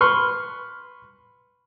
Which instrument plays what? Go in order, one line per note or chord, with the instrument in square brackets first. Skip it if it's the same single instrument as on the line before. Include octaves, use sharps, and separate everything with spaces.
[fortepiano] B4 C6 C#6 F6